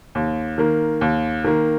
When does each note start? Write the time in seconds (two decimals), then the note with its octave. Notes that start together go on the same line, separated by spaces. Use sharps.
0.15 D#2
0.58 D#3 A#3
1.01 D#2
1.44 D#3 A#3